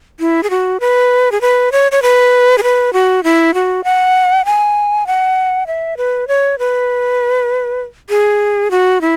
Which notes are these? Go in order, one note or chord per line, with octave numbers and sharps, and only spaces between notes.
E4
G#4
F#4
B4
G#4
B4
C#5
C#5
B4
G#4
B4
F#4
E4
F#4
F#5
G#5
F#5
E5
B4
C#5
B4
G#4
F#4
E4